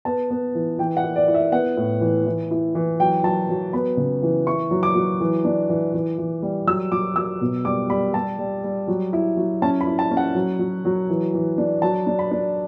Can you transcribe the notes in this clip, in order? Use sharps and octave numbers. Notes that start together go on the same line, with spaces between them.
B3 A5
B3
E3
E3 G5
F#5
E4
D5
E4
E5
B3 F#5
A2
E3
E3
E4
E3
F#3 G5
F#3 A5
F#3
B3 B5
C#3
E3
E4 C#6
F#3
D6
F#3
E3
D4
E3
E3
E3
G3
F#3 E6
F#3 D6
F#3 E6
B2
G3 D6
G3 B5
G3 A5
G3
G3
F#3
E4
F#3
C#4 A5
B5
E4
A5
C#4
F#5
F#3
F#3
F#3
E3
E3
D4
F#3 A5
D4
B5
D4